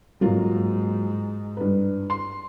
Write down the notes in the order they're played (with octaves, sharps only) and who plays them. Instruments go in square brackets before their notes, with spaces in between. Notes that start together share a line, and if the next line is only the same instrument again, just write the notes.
[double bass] G#2 [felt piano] F#3 A#3 F4
[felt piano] G2 B4
C6